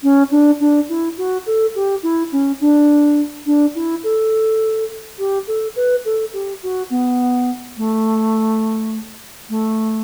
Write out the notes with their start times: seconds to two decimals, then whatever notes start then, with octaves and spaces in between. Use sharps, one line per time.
0.02 C#4
0.30 D4
0.59 D4
0.89 E4
1.17 F#4
1.45 A4
1.75 G4
2.03 E4
2.32 C#4
2.60 D4
3.45 D4
3.75 E4
4.03 A4
5.18 G4
5.47 A4
5.75 B4
6.04 A4
6.33 G4
6.62 F#4
6.90 B3
7.77 A3
9.49 A3